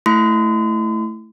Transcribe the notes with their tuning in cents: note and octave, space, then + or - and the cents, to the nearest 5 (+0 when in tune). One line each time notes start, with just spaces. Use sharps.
A3 +0 E4 +0 C6 -40